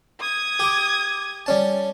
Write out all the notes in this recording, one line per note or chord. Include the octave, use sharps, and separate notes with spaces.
D#6 G#6
G4 D6
G3 C#4 A5